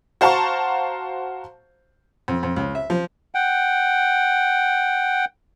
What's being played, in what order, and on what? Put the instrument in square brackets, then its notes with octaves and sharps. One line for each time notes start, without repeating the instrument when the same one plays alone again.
[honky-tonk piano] F#4 C5 F5 A5 A#5 C#6
[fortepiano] F2
F2
C#2
E5
F3
[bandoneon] F#5 G5